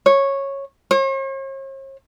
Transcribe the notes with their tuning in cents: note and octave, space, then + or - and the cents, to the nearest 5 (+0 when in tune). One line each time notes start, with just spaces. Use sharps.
C#5 -10
C#5 -45